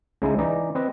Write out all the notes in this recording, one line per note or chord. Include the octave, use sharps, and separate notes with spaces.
C#2 C#3 G#3 D#4 E4
E3 D#4 D5 D#5 A#5
C4 B4 D#5